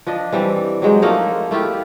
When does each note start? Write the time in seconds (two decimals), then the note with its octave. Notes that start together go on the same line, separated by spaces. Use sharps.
0.07 F3 D4 D#5
0.32 E3 G3 C4
0.82 F#3 G#3 C5
1.02 F3 A3 A#3 D#4
1.51 A3 E4 F4 G4